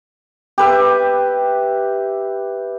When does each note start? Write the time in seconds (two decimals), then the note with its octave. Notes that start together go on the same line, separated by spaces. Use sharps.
0.58 G4 B4 E5